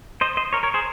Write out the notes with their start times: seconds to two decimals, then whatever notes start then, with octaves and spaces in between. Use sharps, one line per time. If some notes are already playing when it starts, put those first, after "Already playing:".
0.21 C5 D#5
0.37 C5 D#5
0.53 A#4 C#5
0.63 A#4 C#5
0.74 G#4 C5